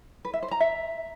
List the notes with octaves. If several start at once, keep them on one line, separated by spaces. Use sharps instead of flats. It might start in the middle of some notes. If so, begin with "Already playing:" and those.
B4
E5
C5
A#5
E5